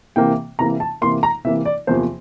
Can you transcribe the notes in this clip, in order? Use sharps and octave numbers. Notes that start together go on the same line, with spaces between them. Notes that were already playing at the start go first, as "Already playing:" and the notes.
C3 E3 A#3 G5
C3 E3 A#3 A#5
A5
C3 E3 A#3 C6
A#5
C3 E3 A#3 E5
D5
E2 C3 F3 A#3 C5